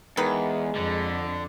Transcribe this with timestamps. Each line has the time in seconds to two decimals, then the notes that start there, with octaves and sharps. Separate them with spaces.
0.17 E2 D#3 G#3 D#4 B4
0.75 F2 D3